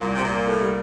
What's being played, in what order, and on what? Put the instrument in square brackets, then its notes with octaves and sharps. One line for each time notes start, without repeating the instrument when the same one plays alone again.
[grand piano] C2 [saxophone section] A#2
[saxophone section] C3
A#2
[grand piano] A#3
[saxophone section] A2
[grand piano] G3